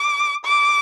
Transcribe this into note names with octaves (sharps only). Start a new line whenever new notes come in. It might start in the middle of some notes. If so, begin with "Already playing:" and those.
Already playing: D6
D6